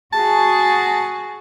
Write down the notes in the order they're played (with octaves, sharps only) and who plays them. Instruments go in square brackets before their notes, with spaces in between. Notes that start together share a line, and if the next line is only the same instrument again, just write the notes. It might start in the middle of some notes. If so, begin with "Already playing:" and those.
[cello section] F#4 G#4 [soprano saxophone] A5